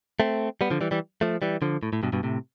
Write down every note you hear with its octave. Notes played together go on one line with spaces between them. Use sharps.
A3 C4
G3 B3
D3 F3
E3 G3
E3 G3
F3 A3
E3 G3
D3 F3
A2
A2
G2 B2
G2 B2
A2 C3